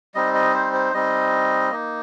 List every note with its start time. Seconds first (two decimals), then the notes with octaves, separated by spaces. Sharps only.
0.15 G3 C4 D#4 D#5
0.34 D#5
0.54 C5
0.73 C5
0.93 G3 C4 D#4 D#5
1.70 A#3 D#4